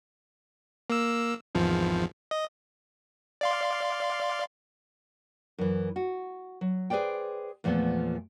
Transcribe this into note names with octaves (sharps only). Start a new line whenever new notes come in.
A#3 E6
G#1 E2 F3
D#5
D5 F5 C6
F#2 E3
F#4
F#3
G#4 B4 C5 D5 G5
E2 A#2 F3 A3 B3